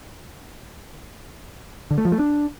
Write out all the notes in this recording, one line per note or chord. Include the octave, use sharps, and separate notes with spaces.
D3
A3
F3
A3
D4